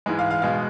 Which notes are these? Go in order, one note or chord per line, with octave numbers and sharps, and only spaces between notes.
G#2 E3 G#3
F5
F5
B2 G#3 F5